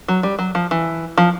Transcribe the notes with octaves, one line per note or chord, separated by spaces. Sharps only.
F#3
G3
F#3
F3
E3
F3